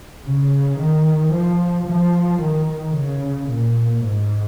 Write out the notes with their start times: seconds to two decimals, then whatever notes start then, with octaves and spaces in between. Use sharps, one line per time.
0.25 C#3
0.78 D#3
1.32 F3
1.88 F3
2.41 D#3
2.96 C#3
3.50 A#2
4.04 G#2